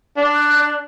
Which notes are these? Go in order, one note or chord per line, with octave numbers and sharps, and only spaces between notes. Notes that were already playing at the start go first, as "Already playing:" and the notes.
D4
F#6